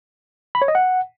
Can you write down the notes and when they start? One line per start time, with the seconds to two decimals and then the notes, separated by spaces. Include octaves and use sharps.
0.55 B5
0.62 C#5
0.68 D#5
0.75 F#5